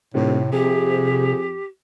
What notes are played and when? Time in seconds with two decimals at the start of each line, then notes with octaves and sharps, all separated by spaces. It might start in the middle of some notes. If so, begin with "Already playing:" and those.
0.14 D#1 A2 C3
0.53 F2 G4 G#4